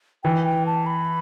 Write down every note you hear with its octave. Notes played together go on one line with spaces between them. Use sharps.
E3 G5
G5
A5
B5